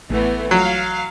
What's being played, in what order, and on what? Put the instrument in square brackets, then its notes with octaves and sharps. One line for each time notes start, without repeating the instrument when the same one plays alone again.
[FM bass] A1 [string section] E3 A3 B3
[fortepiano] F#3 [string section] F5